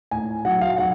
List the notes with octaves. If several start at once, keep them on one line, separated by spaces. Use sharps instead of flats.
A2 G#5
F#3 F#5
F5
F#3 F#5